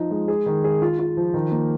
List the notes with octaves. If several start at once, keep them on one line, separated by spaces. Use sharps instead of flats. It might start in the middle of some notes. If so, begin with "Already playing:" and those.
Already playing: F3 D#4
G#3
G#4
D#3
G#4
F4
F4
F3
D#3
A#3